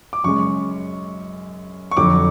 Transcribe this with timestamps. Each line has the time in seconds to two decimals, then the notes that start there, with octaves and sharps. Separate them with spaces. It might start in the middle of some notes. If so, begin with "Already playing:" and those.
0.13 D6
0.24 F#2 C#3 G#3 C#6
1.91 C#6
1.97 F2 D3 F#3 D6